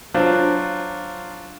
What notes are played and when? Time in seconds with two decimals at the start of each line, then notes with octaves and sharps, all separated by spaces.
0.14 F#3 D4 F4 C5